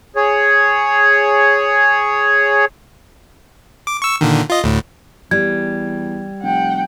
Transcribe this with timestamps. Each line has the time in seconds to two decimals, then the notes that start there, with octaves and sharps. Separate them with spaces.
0.16 G#4 C#5
3.87 D6
4.02 C#6 E6
4.21 A#2 D3 D#3
4.50 F4 D#5
4.64 D2 A2
5.31 E2 G3 G#6
6.42 F1 F#5 G5